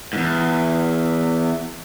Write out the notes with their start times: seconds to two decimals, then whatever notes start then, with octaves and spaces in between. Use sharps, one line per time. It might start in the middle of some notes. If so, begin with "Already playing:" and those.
0.13 E2 G#2